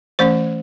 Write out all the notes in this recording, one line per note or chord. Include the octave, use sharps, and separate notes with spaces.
E3 A3 C#4 C5